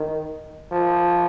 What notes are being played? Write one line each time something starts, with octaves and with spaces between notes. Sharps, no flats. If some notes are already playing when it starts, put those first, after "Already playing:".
Already playing: D#3
F3